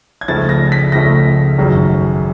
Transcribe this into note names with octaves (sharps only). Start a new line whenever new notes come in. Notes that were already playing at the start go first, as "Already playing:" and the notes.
G#6
C#2 C#3 F3 A3 A6
A#6
B6
C#2 C#3 F3 A3 A#6
G#1 F#2 C#3